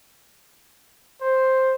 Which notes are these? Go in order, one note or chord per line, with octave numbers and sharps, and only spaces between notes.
C5